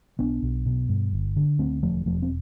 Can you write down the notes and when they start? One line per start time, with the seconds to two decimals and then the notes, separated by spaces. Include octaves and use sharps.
0.19 B1 B3 D4
0.42 B1
0.66 B2
0.89 G2
1.13 G1
1.36 D3
1.59 D2 A3 C4
1.82 E1 F3 A3
2.05 E1 F3 A3
2.22 C4